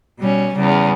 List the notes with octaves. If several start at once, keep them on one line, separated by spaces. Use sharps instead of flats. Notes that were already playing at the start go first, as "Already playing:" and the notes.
B2 G3 C#4
E2 C#3 G3